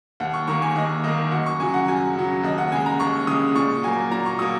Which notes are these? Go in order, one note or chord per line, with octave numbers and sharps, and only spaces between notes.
D#2 F#5
C#6
D#3 A#3 C#6
G#5
D#2 D#5
D#3 A#3 D#5
F#2 F#5
C#6
C#3 F#3 G#5
F#5
F#2 G#5
C#3 F#3
D#2 D#5
F#5
C#3 G#3 G#5
A#5
D#2 C#6
C#3 G#3 D#6
A#2 C#6
F#3 A#3 G#5
A#2 A#5
C#6
F#3 A#3 D#6